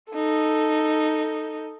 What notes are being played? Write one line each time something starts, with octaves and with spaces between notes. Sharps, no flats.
D#4 A4